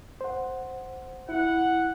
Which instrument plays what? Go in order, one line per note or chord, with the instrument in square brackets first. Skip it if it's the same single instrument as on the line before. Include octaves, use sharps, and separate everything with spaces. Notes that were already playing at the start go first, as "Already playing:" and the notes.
[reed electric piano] C5 F#5
[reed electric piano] E4 [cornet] F#5